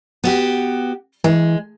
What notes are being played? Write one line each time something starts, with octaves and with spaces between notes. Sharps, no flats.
B3 F#4 G4
E3 G#3